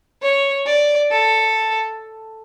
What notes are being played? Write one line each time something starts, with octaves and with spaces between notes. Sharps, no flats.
C#5
D5
A4